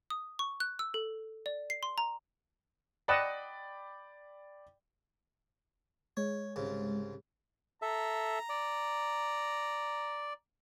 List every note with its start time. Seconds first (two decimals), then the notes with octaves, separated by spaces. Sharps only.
0.10 D#6
0.39 C#6
0.60 F#6
0.79 E6
0.94 A4
1.46 D5
1.70 C7
1.83 C6
1.98 A#5
3.08 D5 D#5 F#5 G5 A5 B5
6.17 G#3 C#5
6.56 C2 G#2 C#3
7.82 A4 E5 A#5
8.49 D5